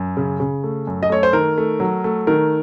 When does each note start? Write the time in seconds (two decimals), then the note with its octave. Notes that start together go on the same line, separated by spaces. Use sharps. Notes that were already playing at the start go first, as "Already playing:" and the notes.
Already playing: F#2
0.17 C#3
0.40 C#3
0.64 A3
0.87 F#2
1.03 D#5
1.10 A3 C#5
1.23 C5
1.33 D#3 A#4
1.58 A3
1.80 F#3
2.04 A3
2.27 D#3 A#4